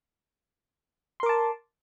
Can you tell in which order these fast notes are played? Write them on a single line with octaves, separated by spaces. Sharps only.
C6 A#4 D6 A5